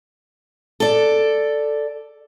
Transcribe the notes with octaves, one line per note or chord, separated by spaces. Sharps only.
A4 D5